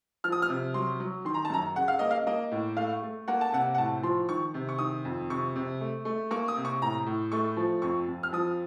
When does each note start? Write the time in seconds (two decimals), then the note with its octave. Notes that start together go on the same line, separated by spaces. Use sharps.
0.24 F3 F6
0.32 D#6
0.42 F6
0.49 C3
0.74 F#3 C6
1.00 F#3
1.25 D#3 C6
1.34 A#5
1.45 A5
1.50 F#2 A#5
1.75 C#3 F#5
1.88 F5
1.99 A#3 D#5
2.11 F5
2.27 A#3 D#5
2.51 A2
2.77 A3 F5
3.02 A3
3.28 A#3 F#5
3.41 A5
3.53 C3 F#5
3.74 F#5
3.78 A2 A5
4.03 F3 C6
4.29 D#3 C#6
4.54 C3
4.69 C#6
4.79 D#3 D#6
5.05 F2
5.30 C3 C#6
5.56 C3
5.81 A3
6.05 A3
6.31 A#3 C#6
6.48 D#6
6.57 C3
6.65 C#6
6.82 A2 A#5
7.06 A2
7.32 A3 C#6
7.57 F3
7.82 F2 C#6
8.08 F2
8.23 F6
8.32 F3 D#6